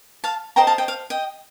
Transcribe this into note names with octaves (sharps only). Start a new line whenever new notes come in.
F5 A5
A4 C5 D#5 G5 A#5
F5 A5
D#5 G5
F5
D#5 G5